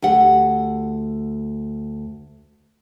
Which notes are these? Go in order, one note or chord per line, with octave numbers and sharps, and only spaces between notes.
D2 G4 F#5